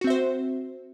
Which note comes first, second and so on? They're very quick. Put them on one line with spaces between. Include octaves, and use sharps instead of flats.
F#4 C4 E5 C5